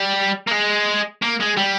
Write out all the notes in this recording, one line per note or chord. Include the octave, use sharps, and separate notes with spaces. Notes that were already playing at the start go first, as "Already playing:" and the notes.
Already playing: G3
A#3
G#3
A#3
G#3
G3